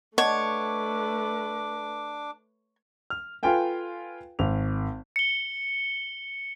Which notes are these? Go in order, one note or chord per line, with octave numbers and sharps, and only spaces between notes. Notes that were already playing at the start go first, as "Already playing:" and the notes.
A3 D4 B4 C#5 D#5 F#5 A5 D6
F6
F4 A4 B4 F5 G5 G#5
G#1 F7
C#7 G7